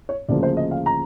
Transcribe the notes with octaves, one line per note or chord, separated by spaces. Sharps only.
C#5
D2 C#3 F3 A#3 D5
C5
D#5
F5
A#5